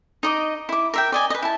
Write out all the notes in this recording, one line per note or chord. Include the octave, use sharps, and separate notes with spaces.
D#4 D#5 D6
E4 D6
A#4 E5 G5
D5 D#5 G#5
B4 D#5
E4 A5